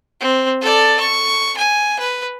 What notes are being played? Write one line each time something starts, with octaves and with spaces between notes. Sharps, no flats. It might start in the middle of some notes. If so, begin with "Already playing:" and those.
C4
A4 D5
C#6
G#5
B4